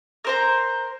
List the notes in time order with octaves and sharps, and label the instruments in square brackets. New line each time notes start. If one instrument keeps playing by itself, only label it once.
[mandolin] A#4 C5 A#5